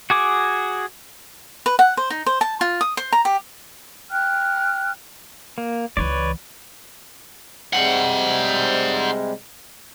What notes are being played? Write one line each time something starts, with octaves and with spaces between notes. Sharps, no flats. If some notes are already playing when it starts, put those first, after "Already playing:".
F#4 G#4 D6
B4
F#5
C5
D#4
C5
A5
F4
D#6
C5
A#5
G4
G5 F6 F#6
A#3
C#2 E3 B4 C#5 D5
C3 G3 G#3 C5 F#5